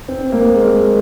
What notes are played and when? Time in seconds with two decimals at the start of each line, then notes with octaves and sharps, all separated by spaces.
0.08 C4
0.32 A#3
0.56 G#3